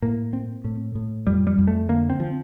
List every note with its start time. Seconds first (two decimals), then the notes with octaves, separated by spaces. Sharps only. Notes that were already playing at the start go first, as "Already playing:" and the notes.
0.02 A2 A#3
0.33 C4
0.64 A2
0.95 A2
1.27 F2 G3
1.47 G3
1.58 F2
1.67 A3
1.89 D3 A#3
2.10 C4
2.20 F3